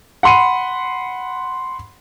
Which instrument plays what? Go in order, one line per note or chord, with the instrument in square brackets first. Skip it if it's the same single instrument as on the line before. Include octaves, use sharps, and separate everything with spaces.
[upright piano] F#5 B5 C6 C#7 D#7